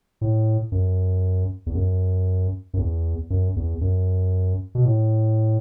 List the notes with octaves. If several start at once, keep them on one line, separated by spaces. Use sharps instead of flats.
A2
F#2
E2
F#2
F#2
E2
F#2
E2
F#2
B2
A2